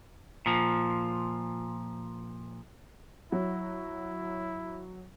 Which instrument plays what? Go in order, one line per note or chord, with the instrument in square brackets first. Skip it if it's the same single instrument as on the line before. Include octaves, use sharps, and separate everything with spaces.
[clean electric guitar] A#2 F3
[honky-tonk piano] F#3 [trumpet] E4